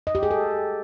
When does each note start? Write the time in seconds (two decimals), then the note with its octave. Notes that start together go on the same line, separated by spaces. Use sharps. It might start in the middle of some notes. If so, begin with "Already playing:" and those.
0.07 D#5
0.15 G4
0.23 G#4
0.31 A4